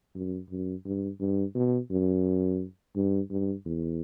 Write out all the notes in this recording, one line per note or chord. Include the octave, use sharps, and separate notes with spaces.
F#2
F#2
G2
G2
B2
F#2
G2
G2
E2